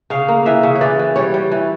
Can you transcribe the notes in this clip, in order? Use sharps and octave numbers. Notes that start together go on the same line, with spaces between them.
C#3 F5
A#3
E3 E5
C#3
C#5
E3 D5
E3
G3 C#5
G3
E3